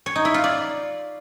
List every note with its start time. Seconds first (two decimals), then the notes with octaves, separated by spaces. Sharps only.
0.06 C#5
0.16 D#4
0.25 E4
0.34 F4
0.44 D5